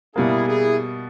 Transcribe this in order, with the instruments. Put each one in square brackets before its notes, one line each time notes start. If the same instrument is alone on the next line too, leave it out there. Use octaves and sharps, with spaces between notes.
[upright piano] B2 G3 A#3 [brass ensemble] E4 G#4
[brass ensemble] E4 G#4